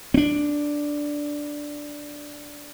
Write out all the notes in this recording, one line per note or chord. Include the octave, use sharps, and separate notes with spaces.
C4 D4